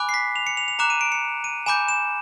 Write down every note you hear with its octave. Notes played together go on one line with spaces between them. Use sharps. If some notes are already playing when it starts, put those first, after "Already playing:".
Already playing: G#5 B5 D6 F#6
C7
B6
F7
C#7
F7
F7
A#5 D6 F#6 E7
D#7
D7
C#7
D#7
G#5 B5 D6 G6 E7
E7